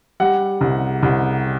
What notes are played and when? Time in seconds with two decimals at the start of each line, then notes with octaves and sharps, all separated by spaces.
0.20 G3 F#5
0.61 C2
1.03 C2